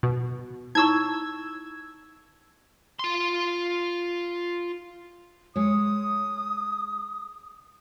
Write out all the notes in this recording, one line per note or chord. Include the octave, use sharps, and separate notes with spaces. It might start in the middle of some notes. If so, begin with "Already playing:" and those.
B2
D#4 E4 C#6 E6 G#6
F4 C6
G#3 C#5 D#6